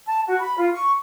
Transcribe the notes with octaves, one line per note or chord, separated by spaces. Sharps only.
A5
F#4
B5
F4
C#6